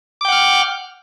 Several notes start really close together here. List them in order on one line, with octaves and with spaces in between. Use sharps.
D6 G5 F#5 F6